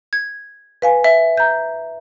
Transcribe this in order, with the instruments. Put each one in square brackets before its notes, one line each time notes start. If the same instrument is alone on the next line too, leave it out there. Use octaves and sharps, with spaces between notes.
[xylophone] G#6
[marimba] B4 F5 G#5
[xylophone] E5
[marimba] A#5 G6